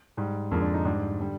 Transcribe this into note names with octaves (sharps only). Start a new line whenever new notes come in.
G#2 G3
F2 D3 F3 G#3 A#3
D4
D#4
G#2 G3 D4
D3 G3